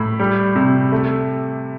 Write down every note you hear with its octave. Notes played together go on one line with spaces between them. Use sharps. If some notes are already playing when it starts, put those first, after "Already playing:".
Already playing: A2 B5
G3
C3
A3